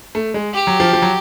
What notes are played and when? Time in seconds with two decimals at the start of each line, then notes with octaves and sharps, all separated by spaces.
0.15 A3
0.34 G#3
0.54 G4
0.67 F#3
0.80 F3
0.93 F3
1.02 F#3